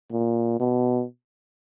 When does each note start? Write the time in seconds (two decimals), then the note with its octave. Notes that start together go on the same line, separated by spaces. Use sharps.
0.12 A#2
0.60 B2